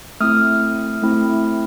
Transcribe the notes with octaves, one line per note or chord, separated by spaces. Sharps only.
A3 C4 E4 D#6 F6
A3 C4 E4